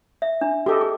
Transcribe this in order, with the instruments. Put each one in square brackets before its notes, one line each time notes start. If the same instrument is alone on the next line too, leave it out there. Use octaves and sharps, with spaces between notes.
[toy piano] E5
D4
[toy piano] F#4 D6 [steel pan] G4 A4 D#5
[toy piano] G#4